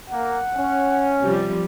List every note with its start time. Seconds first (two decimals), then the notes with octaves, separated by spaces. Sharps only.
0.10 A#3 F#5
0.55 C#4
1.21 C3 F3 G3